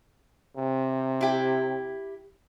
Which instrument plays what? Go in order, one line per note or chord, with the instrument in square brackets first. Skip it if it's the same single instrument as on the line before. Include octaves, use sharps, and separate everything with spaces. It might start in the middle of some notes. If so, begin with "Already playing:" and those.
[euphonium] C3
[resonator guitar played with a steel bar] E4 G4